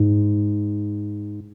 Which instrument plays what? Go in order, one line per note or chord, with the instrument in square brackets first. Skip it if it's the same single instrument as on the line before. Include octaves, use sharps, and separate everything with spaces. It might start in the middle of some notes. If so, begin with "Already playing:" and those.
Already playing: [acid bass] G#2